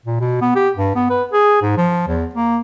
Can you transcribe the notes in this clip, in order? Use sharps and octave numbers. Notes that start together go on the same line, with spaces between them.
A#2
B2
B3
G4
G2
B3
B4
G#4
G#2
F3
E2
A#3